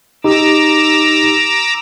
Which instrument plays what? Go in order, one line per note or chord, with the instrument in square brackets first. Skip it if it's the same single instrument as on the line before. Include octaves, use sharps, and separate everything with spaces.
[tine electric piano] D#4 G4 [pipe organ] A#5 D6 E6